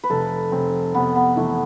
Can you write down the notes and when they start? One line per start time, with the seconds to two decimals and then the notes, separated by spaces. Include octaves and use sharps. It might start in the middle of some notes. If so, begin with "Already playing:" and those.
0.04 B4
0.10 F1 A4
0.52 F1 C4
0.94 F1 B3
1.16 B3
1.36 E3 A3